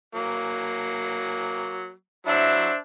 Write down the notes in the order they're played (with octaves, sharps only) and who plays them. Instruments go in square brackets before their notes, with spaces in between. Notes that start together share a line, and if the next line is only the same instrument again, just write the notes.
[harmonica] F#3 A#3
[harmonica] F#3 E4 F#4 [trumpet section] D4 C5 E5